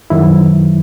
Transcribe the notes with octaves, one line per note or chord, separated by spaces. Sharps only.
F#2 D#3 F#3 E4